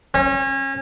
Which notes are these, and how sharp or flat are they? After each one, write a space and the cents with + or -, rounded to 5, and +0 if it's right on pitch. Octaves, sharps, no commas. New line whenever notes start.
C#4 -30